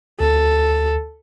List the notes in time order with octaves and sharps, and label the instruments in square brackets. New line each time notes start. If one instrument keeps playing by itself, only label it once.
[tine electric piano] D2 [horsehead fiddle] A4